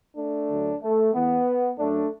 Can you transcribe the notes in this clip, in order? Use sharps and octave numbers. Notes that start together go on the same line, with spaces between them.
A3 D4
D2 D3 F#3
A3
E2 E3 B3
F#2 F#3 A3 D4